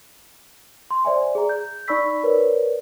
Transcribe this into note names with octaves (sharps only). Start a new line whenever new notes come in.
C6
C5 D5 E5 G#5
G#4 D5 A#5
G6
D#4 D5 B5 C#6 E6 B6
A#4 B4 C#5 D5